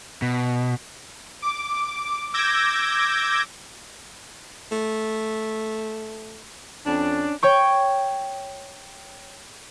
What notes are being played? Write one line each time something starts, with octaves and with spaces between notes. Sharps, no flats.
B2
D6
D6 E6 G6 G#6 A#6
A3
F2 C#4 D4
C#5 G5 C#6